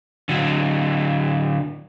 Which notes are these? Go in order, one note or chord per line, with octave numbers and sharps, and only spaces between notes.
D3 F#3